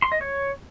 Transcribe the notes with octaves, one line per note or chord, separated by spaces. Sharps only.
C6
D#5
C#5